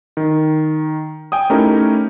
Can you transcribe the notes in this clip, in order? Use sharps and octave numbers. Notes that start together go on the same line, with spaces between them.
D#3
G5 G#5 D#6
A3 C#4 D#4 E4 G4 A#4